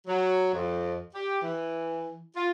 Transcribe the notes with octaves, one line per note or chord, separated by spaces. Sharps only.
F#3
F2
G4
E3
F4